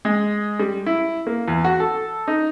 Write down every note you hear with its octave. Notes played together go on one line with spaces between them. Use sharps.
G#3
G3
E4
A#3
E2
F#4
A4
D#4